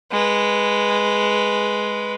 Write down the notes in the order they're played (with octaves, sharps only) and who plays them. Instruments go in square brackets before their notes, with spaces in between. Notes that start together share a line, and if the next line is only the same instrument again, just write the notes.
[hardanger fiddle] G#3 B4